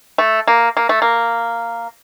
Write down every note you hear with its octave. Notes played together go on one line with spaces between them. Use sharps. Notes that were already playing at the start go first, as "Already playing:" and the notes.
A3
A#3
A#3
A3
A#3